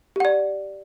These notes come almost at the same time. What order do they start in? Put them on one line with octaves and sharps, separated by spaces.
G4 F#5 D5